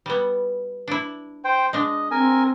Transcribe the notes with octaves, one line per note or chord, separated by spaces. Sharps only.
G3 B3
D4 E4
C5 G5
G#3 D4 D#5
C4 A#4 G#5